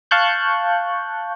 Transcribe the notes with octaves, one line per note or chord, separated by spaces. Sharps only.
F5 A5 C#6 F#6 G6